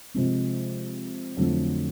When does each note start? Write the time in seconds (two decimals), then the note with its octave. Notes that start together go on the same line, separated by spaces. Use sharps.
0.14 C3 F3 G#3 C4
1.37 F2 D3 F#3 A3